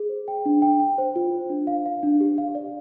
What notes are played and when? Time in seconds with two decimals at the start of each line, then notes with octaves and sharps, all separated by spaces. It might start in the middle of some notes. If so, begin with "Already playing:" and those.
Already playing: G#4
0.09 C5
0.28 G5
0.46 D4
0.62 G5
0.80 G5
0.98 C5
1.16 F4
1.32 C5
1.50 D4
1.67 F5
1.86 F5
2.03 D4
2.21 G4
2.38 F5
2.55 D5